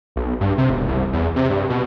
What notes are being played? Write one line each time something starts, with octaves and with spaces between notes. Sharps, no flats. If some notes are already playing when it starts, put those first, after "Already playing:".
B1
G2
C3
E1
C2
E2
C3
G2
B2